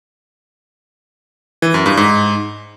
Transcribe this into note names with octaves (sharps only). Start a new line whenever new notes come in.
E3
F#2
G2
G#2